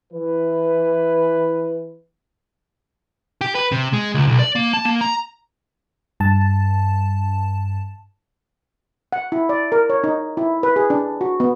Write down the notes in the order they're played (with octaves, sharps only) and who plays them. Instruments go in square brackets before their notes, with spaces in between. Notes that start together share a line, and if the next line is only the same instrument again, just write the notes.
[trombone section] E3 B4
[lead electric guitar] G4
B4
C3
G#3
C#2
B1
D5
A#3
A5
A#3
A#5
[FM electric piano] G2 A5
[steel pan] F#5
E4
D5
A#4
C#5
D#4
E4
B4
G#4
D4
F#4
B3